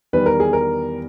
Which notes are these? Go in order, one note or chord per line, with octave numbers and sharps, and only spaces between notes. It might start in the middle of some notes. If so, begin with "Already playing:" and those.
E2 D#3 G3 B4
A#4
G#4
A#4